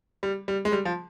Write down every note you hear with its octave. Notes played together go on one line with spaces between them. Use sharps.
G3
G3
G#3
G3
F3